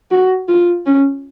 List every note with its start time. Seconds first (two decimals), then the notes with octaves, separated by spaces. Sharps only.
0.11 F#4
0.48 F4
0.86 C#4